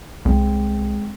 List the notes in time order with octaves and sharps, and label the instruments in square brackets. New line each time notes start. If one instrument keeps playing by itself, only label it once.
[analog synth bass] C2 [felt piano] G#3 C4